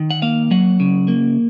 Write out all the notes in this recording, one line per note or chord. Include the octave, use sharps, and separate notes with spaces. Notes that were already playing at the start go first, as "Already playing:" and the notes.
Already playing: D#3
F#5
A#3 F5
F#3 F#5
C#3
A#3